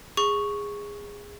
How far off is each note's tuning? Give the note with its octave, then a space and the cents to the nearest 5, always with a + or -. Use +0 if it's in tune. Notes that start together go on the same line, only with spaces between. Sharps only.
G#4 -15 C#6 +0